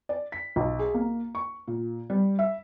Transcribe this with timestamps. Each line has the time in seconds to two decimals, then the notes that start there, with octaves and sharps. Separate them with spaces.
0.09 D5
0.32 B6
0.56 B1
0.79 G#4
0.94 A#3
1.35 C#6
1.67 A#2
2.10 G3
2.39 E5